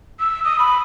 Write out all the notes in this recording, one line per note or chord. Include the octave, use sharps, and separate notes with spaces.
E6
D#6
B5